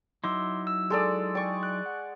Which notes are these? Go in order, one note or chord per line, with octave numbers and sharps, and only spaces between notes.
F#3 D#4 E4 C6 D6 E6
E6
G#3 A4 D5
D5 G5 G#5 C#6
F#6
F#5